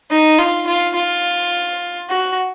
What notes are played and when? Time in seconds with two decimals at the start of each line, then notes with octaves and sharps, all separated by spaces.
0.11 D#4
0.39 F4
0.67 F4
0.95 F4
2.09 F#4